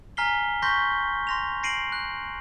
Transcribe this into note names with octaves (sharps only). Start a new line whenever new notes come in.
G#5 A#5 F6 B6 C7 G7
C6 C#6 G6 A#6 B6 G7
C6 A#6 F7
A#6 C7 D7 D#7 F#7
F#6